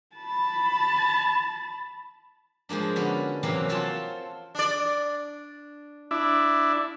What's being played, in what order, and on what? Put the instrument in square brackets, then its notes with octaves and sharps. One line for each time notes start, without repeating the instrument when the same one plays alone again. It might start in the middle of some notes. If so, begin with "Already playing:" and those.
[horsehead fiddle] A5 B5
[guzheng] F3 G#3 A#3 D4
D3 B3 C#4 F#4 D5
C3 E3 F#3 A#3 C4 C#4
C4 F4 A4 C#5 F#5 A5
[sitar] D4 D5
[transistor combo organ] D4 E4